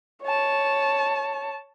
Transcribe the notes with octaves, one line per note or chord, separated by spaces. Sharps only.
C#5 A5